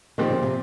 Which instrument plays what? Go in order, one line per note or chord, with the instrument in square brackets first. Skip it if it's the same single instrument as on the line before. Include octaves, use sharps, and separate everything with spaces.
[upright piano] A#2 F3 C4 G4 [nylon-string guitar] D#3
[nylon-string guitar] C#3
C3